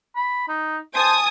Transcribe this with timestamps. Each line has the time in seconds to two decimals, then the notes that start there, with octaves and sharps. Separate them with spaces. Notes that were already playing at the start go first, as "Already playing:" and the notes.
0.16 B5
0.48 D#4
0.94 C5 G#5 A5 D#6